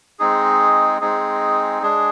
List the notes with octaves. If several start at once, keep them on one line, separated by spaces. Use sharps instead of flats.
G#3 C4 D#4 G#4
G#3 C4 D#4 G#4
G#3 D4 G#4